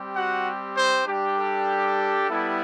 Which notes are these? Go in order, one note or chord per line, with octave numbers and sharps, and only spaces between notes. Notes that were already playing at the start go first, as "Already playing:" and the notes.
Already playing: G3 C4 G4
F#4 F#5
C4 C5
G3 D4 G4
A4
G3 B3 E4 G4